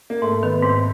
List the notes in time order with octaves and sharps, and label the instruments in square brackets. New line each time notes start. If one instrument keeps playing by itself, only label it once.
[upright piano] A#3
[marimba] G#2 [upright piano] A3
[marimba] D#3 [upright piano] B3
[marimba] G#2 [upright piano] C4